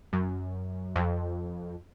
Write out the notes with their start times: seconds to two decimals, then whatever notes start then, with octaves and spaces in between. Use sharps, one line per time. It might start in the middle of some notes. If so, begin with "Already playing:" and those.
0.13 F#2
0.96 F2